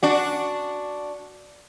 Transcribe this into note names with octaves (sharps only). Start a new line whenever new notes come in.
D4 F#4